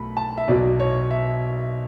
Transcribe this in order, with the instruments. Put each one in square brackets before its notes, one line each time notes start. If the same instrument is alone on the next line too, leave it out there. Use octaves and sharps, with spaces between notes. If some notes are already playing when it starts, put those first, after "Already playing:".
Already playing: [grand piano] B1 B2 A3 B5
A5
E5
B1 B2 F#3 D5
C#5
E5